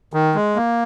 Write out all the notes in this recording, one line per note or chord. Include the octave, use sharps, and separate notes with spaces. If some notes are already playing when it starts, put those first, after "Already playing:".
D#3
G#3
A#3